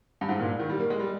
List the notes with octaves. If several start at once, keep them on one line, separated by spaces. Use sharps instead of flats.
G2
G#2
A#2
D#3
G3
A#3
G#3
G3